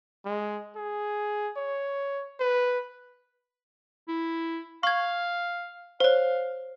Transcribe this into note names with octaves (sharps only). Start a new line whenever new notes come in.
G#3
G#4
C#5
B4
E4
F5 C#6 G#6
C5 C#5 F5